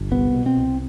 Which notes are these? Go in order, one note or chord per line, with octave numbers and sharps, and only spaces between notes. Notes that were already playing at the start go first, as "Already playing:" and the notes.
Already playing: G1
C2 B3
B2
C4
C2